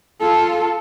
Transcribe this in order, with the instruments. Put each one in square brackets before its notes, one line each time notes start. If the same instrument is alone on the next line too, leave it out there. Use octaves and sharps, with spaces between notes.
[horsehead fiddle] F4 A4